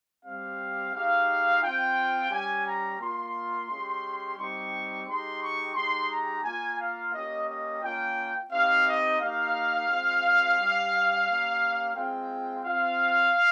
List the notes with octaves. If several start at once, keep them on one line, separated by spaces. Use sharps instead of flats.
G3 C4 G4 F5
G#3 D#4 G4 F5
C4 F4 G5
G3 C#4 G4 G#5
A#5
A#3 F4 C6
G#3 C#4 G4
G3 C4 D#4 G4 C#6
G#3 D#4 G4 C6
C#6
G#3 D#4 G4 C6
A#5
A#3 F4 G#5
F5
A#3 C#4 G4 D#5
D#5
A#3 C#4 F4 G5
C4 D#4 G4 F5
D#5
A#3 D#4 G4 F5
G#3 C4 F4
G3 C#4 G4
A#3 C#4 G4
G#3 C4 F4 G5
C4 F4 F5